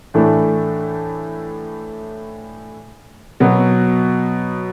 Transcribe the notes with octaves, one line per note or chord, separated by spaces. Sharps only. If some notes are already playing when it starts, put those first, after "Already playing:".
A2 E3 A3 D4 A4
B2 F#3 B3